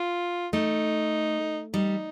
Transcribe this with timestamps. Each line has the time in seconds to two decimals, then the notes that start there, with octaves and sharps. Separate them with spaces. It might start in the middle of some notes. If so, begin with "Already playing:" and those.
Already playing: F4
0.53 A3 D#4
1.74 G3 D#4